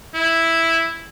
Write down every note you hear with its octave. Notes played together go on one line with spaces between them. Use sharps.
E4